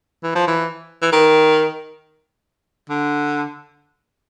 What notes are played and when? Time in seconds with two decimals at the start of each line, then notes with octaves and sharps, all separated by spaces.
0.23 E3
0.35 F3
0.47 E3
1.02 E3
1.12 D#3
2.89 D3